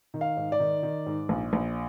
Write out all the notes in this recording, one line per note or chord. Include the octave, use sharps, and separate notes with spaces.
D#3
F5
G#2
D5
D#3
D#3
G#2
A#1
A#1